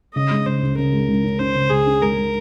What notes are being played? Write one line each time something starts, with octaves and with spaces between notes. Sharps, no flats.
C#3 D#5
G#3
C#3 C5
C#2
C#3 A#4
G#3
C#2
C#4
C#4 C5
C#3
C#2 G#4
C#4
G#3 A#4
G#3